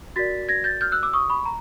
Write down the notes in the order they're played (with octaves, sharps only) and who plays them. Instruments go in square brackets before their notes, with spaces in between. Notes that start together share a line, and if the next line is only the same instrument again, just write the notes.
[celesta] F#4 A#4 D5 A6 B6
G#6 A#6
G6 A6
F6 G6
E6 F#6
D6 E6
C#6 D#6
B5 C#6
A#5